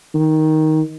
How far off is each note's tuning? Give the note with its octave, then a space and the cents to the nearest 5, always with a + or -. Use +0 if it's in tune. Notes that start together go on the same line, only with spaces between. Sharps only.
D#3 +5